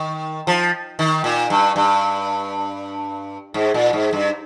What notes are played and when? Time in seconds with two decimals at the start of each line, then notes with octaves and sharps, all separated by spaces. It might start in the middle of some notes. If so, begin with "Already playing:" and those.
Already playing: D#3
0.47 F3
0.99 D#3
1.24 A#2
1.50 G2
1.76 G2
3.54 G#2
3.74 A#2
3.93 G#2
4.13 G2